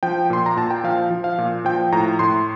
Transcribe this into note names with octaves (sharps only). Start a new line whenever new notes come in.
F3 G5
A#2 C6
A#5
A#2 A5
G5
F3 F5
F3
F5
A#2
F3 G5
A2 A#5
A2 C6